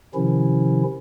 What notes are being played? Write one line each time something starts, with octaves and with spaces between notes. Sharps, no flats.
C3 D#3 F3 C#4 E4